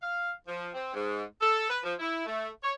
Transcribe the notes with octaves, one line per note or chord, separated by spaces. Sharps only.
F5
F3
C4
G#2
A4
B4
F3
E4
A3
C#5